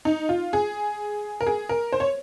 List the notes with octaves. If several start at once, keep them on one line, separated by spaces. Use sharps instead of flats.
D#4
F4
G#4
A#4
G#4
A#4
C5
C#5